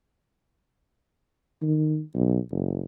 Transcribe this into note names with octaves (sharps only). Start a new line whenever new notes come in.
D#3
B1
F#1